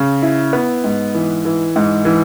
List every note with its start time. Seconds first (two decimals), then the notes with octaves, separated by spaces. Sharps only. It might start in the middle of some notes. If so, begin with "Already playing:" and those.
Already playing: C#3
0.22 E4
0.53 B3
0.84 G#2
1.14 E3
1.45 E3
1.76 G#2
2.05 E3